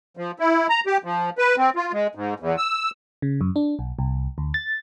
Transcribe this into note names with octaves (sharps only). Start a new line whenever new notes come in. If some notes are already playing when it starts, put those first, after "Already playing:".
F3
E4
A#5
G4
F3
B4
C4
F4
G#3
G#2
E2
E6
C#3
F#2
D4
B1
C2
D2
A6